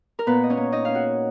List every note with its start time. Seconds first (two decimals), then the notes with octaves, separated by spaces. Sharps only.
0.19 A#4
0.27 A#2 B3 B4
0.43 D#5
0.50 C#4 C#5
0.57 A#3
0.72 D#4 D#5
0.85 C#4 F5
0.95 F#4 F#5